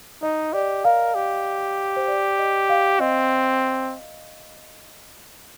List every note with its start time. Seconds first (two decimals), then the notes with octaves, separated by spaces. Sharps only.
0.22 D#4 D#5
0.53 G4 D5
0.84 A#4 F5
1.15 G4
1.96 C5
2.07 D5
2.39 D#5
2.69 F5
3.00 C4 D#5